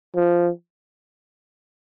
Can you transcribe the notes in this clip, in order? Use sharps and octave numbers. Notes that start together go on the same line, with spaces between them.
F3